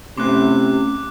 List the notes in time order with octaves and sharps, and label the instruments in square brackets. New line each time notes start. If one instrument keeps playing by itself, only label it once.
[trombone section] C3 [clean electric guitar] A3 C#4 C6 [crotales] D6 F#6